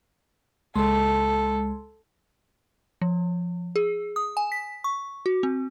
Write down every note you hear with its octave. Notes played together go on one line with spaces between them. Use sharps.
C#2 G#3 A4 C6
F3
G#4
D#6
G#5
B6
C#6
F#4
C4